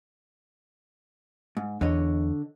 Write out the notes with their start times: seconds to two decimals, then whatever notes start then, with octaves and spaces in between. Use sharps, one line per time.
1.57 G#2
1.81 E2 D3 C#5 D#5